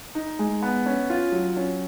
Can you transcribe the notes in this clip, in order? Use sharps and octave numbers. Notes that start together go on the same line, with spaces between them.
D#4
G#3
B3
C#4
F4
F#3
C#4